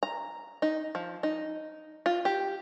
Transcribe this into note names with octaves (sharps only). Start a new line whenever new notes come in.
A#5
D#4
F3
D#4
F4
G4